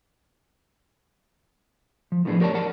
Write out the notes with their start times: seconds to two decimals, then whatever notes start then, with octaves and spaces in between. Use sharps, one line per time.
2.12 F3
2.25 A2 F3 B3 D4 F4 G#4
2.40 G4 A#4 C#5 D5 A5
2.54 A#4 D5 F#5 A5